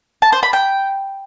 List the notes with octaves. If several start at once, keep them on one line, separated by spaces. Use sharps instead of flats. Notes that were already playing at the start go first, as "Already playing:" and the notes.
A5
C5
B5
G5